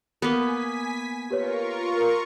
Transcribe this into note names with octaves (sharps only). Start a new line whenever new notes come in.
A#3 B3 G#5 B6
F4 G4 A#4 B4 C#5 C#6